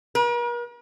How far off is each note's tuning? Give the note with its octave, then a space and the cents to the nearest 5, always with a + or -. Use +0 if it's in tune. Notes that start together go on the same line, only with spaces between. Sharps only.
A#4 +45